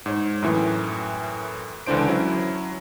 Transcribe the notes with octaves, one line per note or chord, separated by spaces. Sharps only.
G#2 C#5
F#2 A2 E3
C#2 D3 E3 D4 C5 D7
F#3 C#4 E4